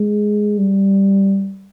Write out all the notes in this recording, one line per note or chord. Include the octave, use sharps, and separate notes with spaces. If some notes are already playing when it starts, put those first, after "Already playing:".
Already playing: G#3
G3